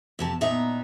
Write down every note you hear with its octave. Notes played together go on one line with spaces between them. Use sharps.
F2 C3 A5
A#2 B3 D#4 E5